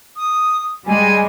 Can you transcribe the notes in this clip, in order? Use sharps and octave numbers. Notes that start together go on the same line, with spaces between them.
D#6
G3 G#3 G#5